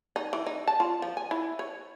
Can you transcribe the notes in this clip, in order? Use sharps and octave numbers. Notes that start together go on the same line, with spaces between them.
D#4
E3
D#4
A5
F4
F3
G#5
E4
C#5